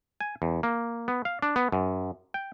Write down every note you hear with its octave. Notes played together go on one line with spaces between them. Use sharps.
G#5
E2
A#3
B3
F5
D4
B3
F#2
G5